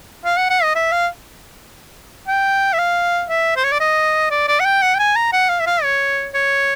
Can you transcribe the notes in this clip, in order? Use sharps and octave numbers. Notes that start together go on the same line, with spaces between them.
F5
F#5
F#5
D#5
E5
F5
G5
E5
F5
E5
C5
C#5
D5
D#5
D5
D5
F#5
G5
F#5
G5
G#5
A#5
F#5
F5
E5
F5
C#5
C#5